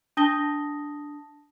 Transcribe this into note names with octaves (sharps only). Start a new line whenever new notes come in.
D4 A5 D#6 A#6 G7